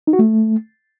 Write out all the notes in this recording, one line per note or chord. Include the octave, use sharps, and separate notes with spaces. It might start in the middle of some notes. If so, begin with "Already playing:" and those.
D#4
F#4
A3